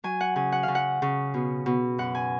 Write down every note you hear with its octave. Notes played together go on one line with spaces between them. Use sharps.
F#3 G#5
F#5
C#3 G#5
F#5
F5
C#3
F#5
C#3
B2
B2
F#2 F#5
G#5